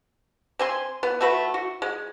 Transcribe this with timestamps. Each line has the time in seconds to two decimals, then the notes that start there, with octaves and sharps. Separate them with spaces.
0.59 C4 G#5 C6
1.03 B3
1.21 A3 F#4 B4
1.54 F#4
1.82 G#3